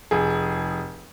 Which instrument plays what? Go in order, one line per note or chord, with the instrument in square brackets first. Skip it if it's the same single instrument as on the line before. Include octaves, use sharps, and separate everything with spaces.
[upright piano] F1 G#4